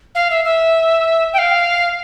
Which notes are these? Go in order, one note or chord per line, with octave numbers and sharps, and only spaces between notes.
F5
E5
E5
G5
F5